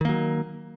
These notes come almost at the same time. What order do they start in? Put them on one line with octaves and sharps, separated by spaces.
D#3 A#3 F#3